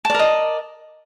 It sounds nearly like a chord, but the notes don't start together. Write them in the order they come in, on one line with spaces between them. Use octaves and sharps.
A5 D5 A#4 D#5